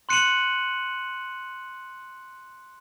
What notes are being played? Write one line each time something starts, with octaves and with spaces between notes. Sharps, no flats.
C6 F#6 C#7 D#7 E7 F#7